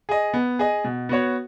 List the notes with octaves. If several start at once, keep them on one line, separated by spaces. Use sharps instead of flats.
G#4 D#5
B3
G#4 D#5
B2
B3 F#4 C#5